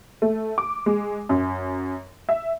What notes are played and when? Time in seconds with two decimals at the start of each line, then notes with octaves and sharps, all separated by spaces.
0.22 A3
0.58 D6
0.86 G#3
1.29 F#2
2.29 E5